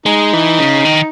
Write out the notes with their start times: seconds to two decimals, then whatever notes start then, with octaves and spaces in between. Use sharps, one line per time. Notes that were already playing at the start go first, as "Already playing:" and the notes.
0.06 G#3 D#4
0.33 E3
0.59 C#3
0.85 D#3